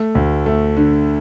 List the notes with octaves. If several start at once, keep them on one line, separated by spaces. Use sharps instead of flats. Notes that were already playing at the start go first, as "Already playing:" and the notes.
Already playing: A3
D2
A3
D3